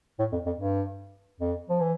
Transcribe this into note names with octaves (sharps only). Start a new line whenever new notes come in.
A2
F2
F2
G2
F2
F3
E3